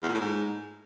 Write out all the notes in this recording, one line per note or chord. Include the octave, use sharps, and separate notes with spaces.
E2
A#2
A2
G#2